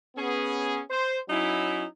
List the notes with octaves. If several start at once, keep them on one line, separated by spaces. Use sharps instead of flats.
B3 C#4 G#4
C5
F#3 C#4 D#4 E4